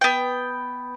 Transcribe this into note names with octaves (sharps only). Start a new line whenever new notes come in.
B3 G5